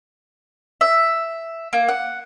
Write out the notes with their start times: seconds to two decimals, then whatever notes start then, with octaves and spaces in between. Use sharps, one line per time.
0.81 E5
1.73 A#3
1.88 F#5